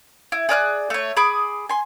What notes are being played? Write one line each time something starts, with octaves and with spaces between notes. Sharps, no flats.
E4
G#4 D5 F6 F#6
A3 C#5
G#4 B5 D6 D#6
G#5 C6